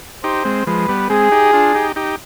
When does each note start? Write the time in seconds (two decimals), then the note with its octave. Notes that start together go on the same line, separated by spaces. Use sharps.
0.24 D#4 G4 C5
0.45 G#3 C4
0.67 F3 G#3 B4
0.89 G3 B3
1.09 G#3 C4 G#4
1.32 D#4 G4
1.53 D4 F4
1.74 D#4 G4
1.96 D#4 G4